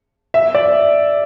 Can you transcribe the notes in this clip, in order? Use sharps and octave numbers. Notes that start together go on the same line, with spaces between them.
E5
D5